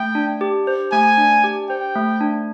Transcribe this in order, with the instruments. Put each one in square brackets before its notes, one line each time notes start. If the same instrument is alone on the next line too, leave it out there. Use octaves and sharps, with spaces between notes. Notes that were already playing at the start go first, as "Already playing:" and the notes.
Already playing: [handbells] A3 [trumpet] G5
[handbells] D4
G4
C5
[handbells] A3 [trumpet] G#5
[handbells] D4
G4
[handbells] C5 [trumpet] G5
[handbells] A3
D4